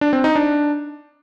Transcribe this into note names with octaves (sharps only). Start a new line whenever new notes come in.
D4
C4
D#4
D4